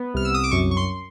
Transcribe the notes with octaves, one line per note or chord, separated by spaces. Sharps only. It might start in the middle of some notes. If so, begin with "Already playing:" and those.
Already playing: B3
C2 F6
E6
D#6
D6
F#2 C#6
C#6
C6